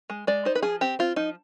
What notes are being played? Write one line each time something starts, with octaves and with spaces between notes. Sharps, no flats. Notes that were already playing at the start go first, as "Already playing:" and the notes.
G#3
G#3 D5
D#4 C5
B4
F3 G#4
C4 G4
C4 F4
F3 D#4